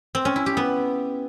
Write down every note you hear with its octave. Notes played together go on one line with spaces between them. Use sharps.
C4
C#4
E4
G4
B3